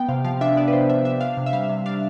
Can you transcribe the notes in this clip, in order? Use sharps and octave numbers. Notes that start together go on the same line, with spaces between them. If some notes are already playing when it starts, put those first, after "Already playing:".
Already playing: B3 G5
C3 F5
F3 F5
D4 E5
B3 D5
B4
C3 C5
F3 E5
D4 E5
D4 F5
C3
E5
G3 F5
C3
D4 F5